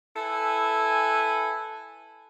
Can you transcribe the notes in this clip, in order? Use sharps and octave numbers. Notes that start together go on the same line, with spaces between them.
E4 A4 B4 G#5